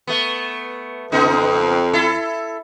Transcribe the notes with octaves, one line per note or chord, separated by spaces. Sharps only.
A3 B3
F2 C#3 B3 D#4
E4 A4